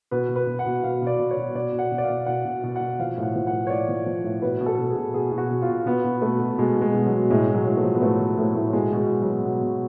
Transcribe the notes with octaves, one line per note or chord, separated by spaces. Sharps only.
B2 B4
B2
B4
B2
F#5
B2
B2 F5
B2 D5
B2
C#5
B2
B2 D5
B2
F#5
B2
D5
F5
B2
B2 F#5
B2
B2
F#5
B2
F3 F5
A2
F#5
F3
F#5
A2
C#5
A2 D5
F3
F3
A2
B2 B4
B2
A4
B2
G#4
B2
B2 G#4
B2
F#4
B2
F4
B2
B2 B3
B2
B2 A3
B2
B2 G#3
B2
G#3
B2
F#3
B2
A2 G#3
A2
F#3
A2
A3
F3
B3
A2 A3
F3
A2 A3
A2
B2 G#3
B2
G#3
B2
F#3
B2
B2
B2